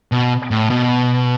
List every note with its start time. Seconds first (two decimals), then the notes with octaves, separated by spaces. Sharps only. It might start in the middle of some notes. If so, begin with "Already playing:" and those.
0.12 B2
0.51 A2
0.70 B2